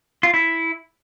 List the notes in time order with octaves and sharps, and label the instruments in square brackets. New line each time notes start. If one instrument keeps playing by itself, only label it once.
[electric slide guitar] F4
E4